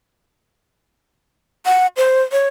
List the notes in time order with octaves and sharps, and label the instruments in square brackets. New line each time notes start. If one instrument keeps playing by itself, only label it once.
[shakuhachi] F#5
C5
C#5